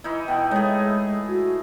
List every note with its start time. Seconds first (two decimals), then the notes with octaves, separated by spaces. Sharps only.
0.04 E3 D#4 E4
0.28 B2 G5
0.51 A2 G#3 G#4
1.29 F#4